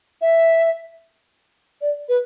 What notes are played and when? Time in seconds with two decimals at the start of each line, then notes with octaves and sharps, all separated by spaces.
0.21 E5
1.81 D5
2.08 B4